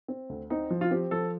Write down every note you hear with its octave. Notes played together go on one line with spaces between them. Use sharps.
C4
D2
C4 D#4
F3
F4
C4 G4
F3 A4